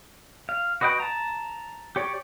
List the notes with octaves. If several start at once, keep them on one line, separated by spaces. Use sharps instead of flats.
F5
F#4 B4 D#5 F#5 G5
A5 A#5
G4 C#5 D5